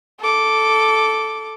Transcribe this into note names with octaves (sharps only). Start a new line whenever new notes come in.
A4 D6